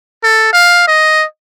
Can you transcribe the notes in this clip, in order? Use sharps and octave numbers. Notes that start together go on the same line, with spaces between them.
A4
F5
D#5